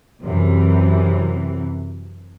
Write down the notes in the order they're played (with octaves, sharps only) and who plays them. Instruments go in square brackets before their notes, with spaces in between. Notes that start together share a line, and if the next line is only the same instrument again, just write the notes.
[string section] F#2 C3 E3